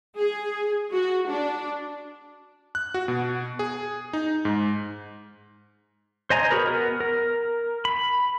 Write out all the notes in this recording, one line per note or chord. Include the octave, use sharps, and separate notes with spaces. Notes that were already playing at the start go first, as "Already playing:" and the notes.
G#4
F#4
D4
F#6
F#4
B2
G#4
D#4
G#2
C5 D#5 G#5 A#5
F#4 G#4 A#4 B4
B3 A#4
A#4
B5